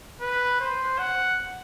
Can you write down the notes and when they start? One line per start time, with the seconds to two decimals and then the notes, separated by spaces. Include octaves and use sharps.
0.21 B4
0.60 C5
0.99 F#5